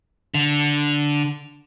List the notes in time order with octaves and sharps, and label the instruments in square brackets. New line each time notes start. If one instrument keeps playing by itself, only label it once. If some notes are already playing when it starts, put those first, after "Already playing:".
[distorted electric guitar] D3